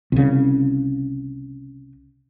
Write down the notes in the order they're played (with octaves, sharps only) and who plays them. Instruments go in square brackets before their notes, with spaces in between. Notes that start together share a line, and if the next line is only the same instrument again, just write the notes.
[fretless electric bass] C2 C#3